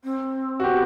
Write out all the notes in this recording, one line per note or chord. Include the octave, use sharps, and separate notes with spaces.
C4
F#4
B3 G4